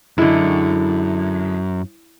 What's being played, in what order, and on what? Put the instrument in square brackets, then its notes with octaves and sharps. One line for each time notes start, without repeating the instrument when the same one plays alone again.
[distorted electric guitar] F#2 [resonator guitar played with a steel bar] D3 G#3 [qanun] E4